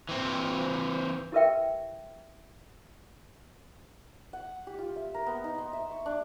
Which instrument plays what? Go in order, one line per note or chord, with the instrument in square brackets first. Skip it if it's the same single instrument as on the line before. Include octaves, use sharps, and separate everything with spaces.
[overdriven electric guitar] E3 C4
[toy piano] E4 G4 A#4 B4 E5 G5
[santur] F#5
G4
F4
E5
A#4
B3
D#4
C6
E5
C#6
D4